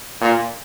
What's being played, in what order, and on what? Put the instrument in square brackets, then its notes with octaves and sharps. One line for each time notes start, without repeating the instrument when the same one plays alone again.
[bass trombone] A#2